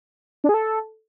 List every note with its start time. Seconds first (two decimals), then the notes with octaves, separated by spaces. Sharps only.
0.44 D4
0.49 G#4
0.54 A4